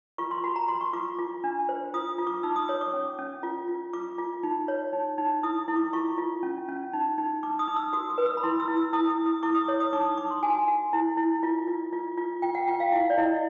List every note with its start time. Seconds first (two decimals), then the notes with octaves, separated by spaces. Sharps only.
0.18 F4 C#6
0.31 C6
0.44 F#4 B5
0.56 A#5
0.68 F#4 C6
0.81 C#6
0.93 F4 D6
1.19 F4
1.44 D4
1.69 C5
1.94 F4 D#6
2.18 F4
2.27 D6
2.43 D#4 E6
2.56 D#6
2.68 C#5 D#6
2.81 D6
2.94 C#4
3.19 C#4
3.43 F4
3.68 F4
3.93 F4 D6
4.18 F4
4.43 D#4
4.68 C#5
4.93 D#4
5.18 D#4
5.43 E4 D#6
5.68 E4
5.76 D6
5.93 F4 C#6
6.18 F4
6.43 C#4
6.69 C#4
6.93 D#4
7.18 D#4
7.43 D#4 D6
7.59 D#6
7.68 D#4
7.76 E6
7.93 F#4 D#6
8.10 D#6
8.18 B4
8.26 E6
8.37 B5
8.43 E4 C6
8.60 E6
8.68 E4
8.77 E6
8.93 E4 D#6
9.10 D#6
9.18 E4
9.26 D#6
9.43 E4 D6
9.55 D#6
9.68 C#5
9.80 D#6
9.93 D#4 D6
10.05 D#6
10.17 D#4 D6
10.31 C6
10.43 F#4 G#5
10.68 F#4
10.93 E4
11.17 E4
11.43 F4
11.67 F4
11.93 F4
12.18 F4
12.42 F4 G5
12.55 F#5
12.68 F4 G5
12.80 F5
12.92 E4 F#5
13.10 D5
13.18 E4 D#5